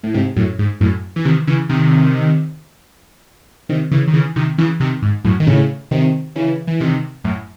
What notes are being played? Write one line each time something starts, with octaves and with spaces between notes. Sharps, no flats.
A2
G#2 C3
F#2 A2
G#2
F#2 A2
E3
C3 D#3
C#3 E3
C3 D#3
C3 D#3
C#3 E3
D#3
C#3 E3
C3 D#3
C#3 E3
C3 D#3
G#2
F#2 A2
D#3
A2 C#3
C3 D#3
C#3 E3
E3
C3 D#3
F#2 A2